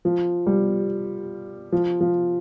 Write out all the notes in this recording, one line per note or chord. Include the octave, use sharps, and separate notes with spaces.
F3
G3
F3
F3